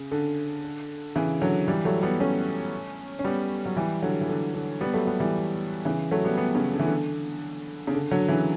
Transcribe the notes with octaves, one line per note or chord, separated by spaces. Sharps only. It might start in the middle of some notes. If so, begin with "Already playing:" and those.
Already playing: C#3
D3
C#3 E3
D3 F#3
E3 G3
F#3 A3
G3 B3
A3 C#4
C#4
G3 B3
F#3
E3 G3
D3 F#3
E3
D3
D3
G3 B3
F#3 A3
G3 B3
E3 G3
C#3 E3
F#3 A3
G3 B3
G3 B3
C#3
D3
E3
D3
C#3
D3
D3 F#3
C#3 E3